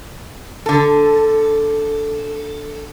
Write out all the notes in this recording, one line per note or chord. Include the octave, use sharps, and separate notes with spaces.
D3 A4